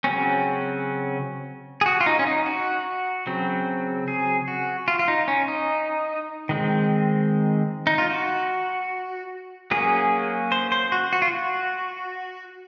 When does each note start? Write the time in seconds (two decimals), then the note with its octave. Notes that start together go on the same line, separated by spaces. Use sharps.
0.04 C#3 F#3 C4 C#4
1.81 G#4
1.86 F#4
2.01 F4
2.06 D#4
2.19 C#4
2.27 D#4
2.46 F#4
3.27 C#3 F#3 C4
4.08 G#4
4.48 F#4
4.88 F4
4.99 F4
5.08 D#4
5.28 C#4
5.48 D#4
6.49 D#3 G#3 C4
7.87 D#4
7.98 F4
8.10 F#4
9.71 F#3 A#3 C#4 G#4
10.52 C5
10.72 C5
10.92 F#4
11.13 F#4
11.22 F4
11.32 F#4